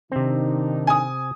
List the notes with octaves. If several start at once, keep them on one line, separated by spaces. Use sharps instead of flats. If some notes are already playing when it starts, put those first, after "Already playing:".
C3 D#3 C4 D4 D#4
G#5 D#6